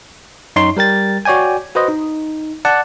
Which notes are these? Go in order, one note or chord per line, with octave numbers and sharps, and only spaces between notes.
F#2 D#4 C#5 C6
G3 A#4 G5 A6
F#4 C#5 D5 G5 G#5
F#4 B4 C5 D#5
D#4
D5 F#5 A5